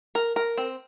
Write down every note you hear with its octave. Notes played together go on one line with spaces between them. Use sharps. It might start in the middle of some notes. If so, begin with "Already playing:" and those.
A#4
A#4
C4